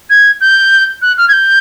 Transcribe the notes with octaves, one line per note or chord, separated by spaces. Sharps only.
G#6
G6
F#6
F6
G#6
G6